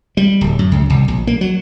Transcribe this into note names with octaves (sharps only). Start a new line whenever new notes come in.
G3
D1
F#2
C#2
C2
A#1
A#3
F#3